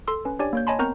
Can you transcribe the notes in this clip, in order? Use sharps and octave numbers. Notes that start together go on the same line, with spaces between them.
A4 C6 E6
C#4 B4
D4 G4 C#5 D5 G#5
A#3 C#5 G6
C#5 D#5 G#5 A5 B5 C6
B3 C4 A#4 A#5 C#6 G6